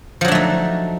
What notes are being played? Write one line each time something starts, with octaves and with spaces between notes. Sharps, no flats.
F3 F#3 A3 D4 D#4